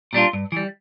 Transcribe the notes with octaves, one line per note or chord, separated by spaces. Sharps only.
A#2 G3 D4 F4
G2
E3 G3